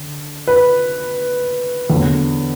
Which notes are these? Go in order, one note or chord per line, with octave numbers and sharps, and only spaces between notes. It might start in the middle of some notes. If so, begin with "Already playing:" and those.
Already playing: D3
B4
E2 D3 F#3